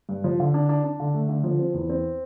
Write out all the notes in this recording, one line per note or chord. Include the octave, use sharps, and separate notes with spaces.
G2
F3
D3
D4
D4
D4
D3
A3
D3
F3
C4
E2
C4